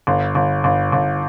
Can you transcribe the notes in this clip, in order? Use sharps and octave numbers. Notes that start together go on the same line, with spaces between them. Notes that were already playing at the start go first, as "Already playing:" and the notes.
G1
G1
G1
G1